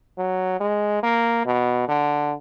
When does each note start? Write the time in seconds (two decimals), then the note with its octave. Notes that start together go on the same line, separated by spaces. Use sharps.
0.18 F#3
0.60 G#3
1.03 A#3
1.46 B2
1.88 D3